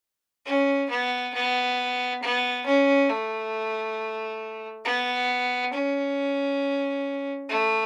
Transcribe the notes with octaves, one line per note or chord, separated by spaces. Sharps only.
C#4
B3
B3
B3
C#4
A3
B3
C#4
A3